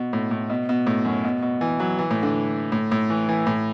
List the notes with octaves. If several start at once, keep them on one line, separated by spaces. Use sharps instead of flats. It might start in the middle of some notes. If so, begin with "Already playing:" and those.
Already playing: B2
A2
A2
B2
B2
A2
F#2
B2
B2
E3
F#3
E3
A2
D3
A2
A2
E3
E3
A2